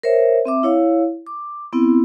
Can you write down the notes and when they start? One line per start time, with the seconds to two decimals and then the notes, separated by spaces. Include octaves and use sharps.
0.03 A#4 C5 C#5 E5
0.45 C4 E5 D6
0.63 E4 C#5 F5
1.27 D6
1.73 B3 C4 E4